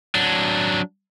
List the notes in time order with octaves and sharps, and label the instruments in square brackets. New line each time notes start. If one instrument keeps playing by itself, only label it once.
[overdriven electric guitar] F#3 D4